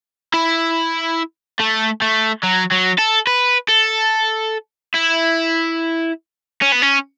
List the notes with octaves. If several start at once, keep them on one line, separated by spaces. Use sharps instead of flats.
E4
A3
A3
F#3
F#3
A4
B4
A4
E4
C#4
B3
C#4